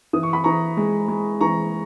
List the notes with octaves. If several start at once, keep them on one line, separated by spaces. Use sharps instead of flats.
E3 D#6
C#6
B5
E3 A#5 C#6
G#3
G#3
E3 A#5 C#6